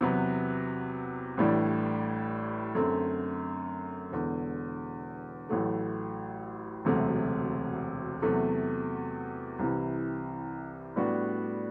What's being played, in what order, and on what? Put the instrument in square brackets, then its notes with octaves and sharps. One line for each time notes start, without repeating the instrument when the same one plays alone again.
[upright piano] E2 C3 F#3 B3
A1 A2 E3 G3 D4
F#2 D3 A3 C4
E1 E2 D3
A1 A2 F#3 A3
E1 D2 C3 F#3 A3
E2 C3 F#3 A3
C2 C3 E3
A2 G3 B3 D4 F#4